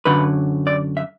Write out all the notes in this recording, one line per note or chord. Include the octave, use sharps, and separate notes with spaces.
F#2 D3 F#3 B4
D5
E5